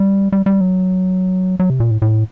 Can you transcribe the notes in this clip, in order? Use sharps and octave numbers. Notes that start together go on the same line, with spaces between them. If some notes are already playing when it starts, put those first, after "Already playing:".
Already playing: G3
G3
G3
F#3
F#3
C3
A#2
A2
A2